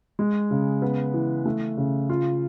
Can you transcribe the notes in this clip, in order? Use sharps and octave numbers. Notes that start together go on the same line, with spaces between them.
G#3
C#3
B3
E3
A3
C#3
F4